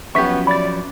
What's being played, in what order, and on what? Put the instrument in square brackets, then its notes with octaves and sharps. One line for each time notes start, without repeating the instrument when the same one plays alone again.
[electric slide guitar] F3 F#3 C#4 [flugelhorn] B3 [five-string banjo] G4 E5 [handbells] C#6 B6
[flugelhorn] D5 [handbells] B5 A6